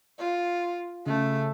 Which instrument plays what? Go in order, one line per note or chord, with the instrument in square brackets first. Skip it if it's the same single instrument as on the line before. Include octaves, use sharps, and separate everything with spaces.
[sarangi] F4
[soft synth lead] C#3 [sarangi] A3